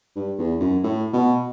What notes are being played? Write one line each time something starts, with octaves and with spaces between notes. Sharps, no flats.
G2
E2
F#2
A2
B2